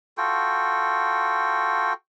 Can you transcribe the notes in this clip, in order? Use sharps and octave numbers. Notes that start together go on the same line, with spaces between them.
F4 F#4 A4 G5